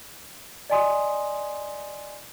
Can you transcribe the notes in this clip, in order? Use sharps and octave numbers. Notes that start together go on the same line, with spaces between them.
D5 D#5 G#5 C6 D#6